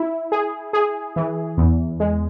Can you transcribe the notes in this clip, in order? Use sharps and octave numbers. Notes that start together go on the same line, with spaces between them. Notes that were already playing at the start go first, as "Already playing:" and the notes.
Already playing: E4
G#4
G#4
E3
E2
G#3